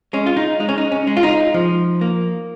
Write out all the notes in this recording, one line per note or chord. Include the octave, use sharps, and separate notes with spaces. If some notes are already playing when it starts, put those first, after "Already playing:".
G#3 C#4
F4
D#4
G#3 D#4
C#4
D#4
C#4
G#3
F4
D#4
F3
A#3